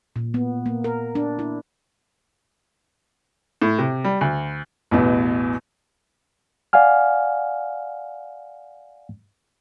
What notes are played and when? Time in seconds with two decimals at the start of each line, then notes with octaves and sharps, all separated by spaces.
0.16 A#2
0.34 B3
0.66 A#3
0.84 A#4
1.15 D4
1.39 E4
3.62 A2
3.78 C3
4.04 G3
4.21 D2
4.91 A1 E2 B2
6.73 D5 F5 F#5 G#5 F6